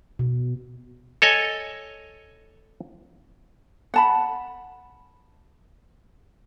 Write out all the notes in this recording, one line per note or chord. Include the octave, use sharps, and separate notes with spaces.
B2
A4 C#5 D#5 G#5
F#5 A5 B5